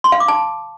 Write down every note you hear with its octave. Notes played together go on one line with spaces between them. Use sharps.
C6
F5
D6
A5